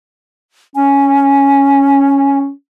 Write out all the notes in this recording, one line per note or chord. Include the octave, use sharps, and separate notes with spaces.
C#4 G#5